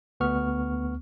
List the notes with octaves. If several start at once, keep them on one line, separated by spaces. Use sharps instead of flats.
D2 B3 C#6 F6